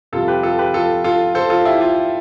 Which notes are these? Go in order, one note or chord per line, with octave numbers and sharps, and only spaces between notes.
F2 C3 G3 F4 A4
G4 B4
F4 A4
G4 B4
F4 A4
F4 A4
A4 C5
F4 A4
E4 G4
F4